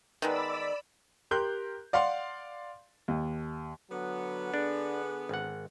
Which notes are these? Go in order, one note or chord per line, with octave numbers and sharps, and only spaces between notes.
D#3 G#3 B3 D5 B5 E6
G4 A#4 C6 F#6 G6
D5 F5 F#5 C6
D#2
D3 F#3 B3
D4 G#4
G#1 F#5